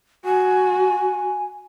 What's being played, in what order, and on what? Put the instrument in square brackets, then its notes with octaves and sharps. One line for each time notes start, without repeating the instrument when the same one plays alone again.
[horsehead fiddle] F#4 [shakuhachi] G#5